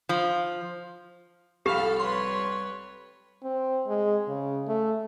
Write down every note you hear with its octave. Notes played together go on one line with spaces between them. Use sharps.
F3
C2 F3 G4 A4 F5 B5 F6
G3 B4 C#5 C6
C4
G#3
C#3
A3